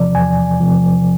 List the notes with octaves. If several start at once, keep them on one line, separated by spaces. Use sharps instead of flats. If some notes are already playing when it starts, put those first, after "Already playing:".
Already playing: E2 C3 F3 D5
E2 G#5
C3 F3